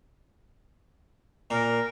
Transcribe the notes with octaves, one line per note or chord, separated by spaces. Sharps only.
A#2 A#4